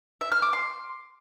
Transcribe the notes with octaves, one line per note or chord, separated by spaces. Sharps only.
E5
F6
D6
C6